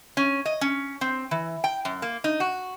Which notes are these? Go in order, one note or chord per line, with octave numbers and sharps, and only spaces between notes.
C#4
D#5
C#4
C4
E3
G5
F#2
A#3
D#4
F#4